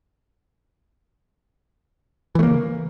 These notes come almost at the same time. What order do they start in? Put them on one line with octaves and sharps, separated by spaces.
E3 A3 A#3 C#3